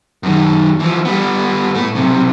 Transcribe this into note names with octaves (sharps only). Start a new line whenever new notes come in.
F#2 D#3
E3 F3
G3 B3
A2 A3
B1 C3